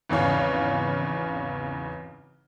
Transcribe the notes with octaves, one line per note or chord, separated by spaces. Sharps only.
G#1 E2 C#3 C#5 F5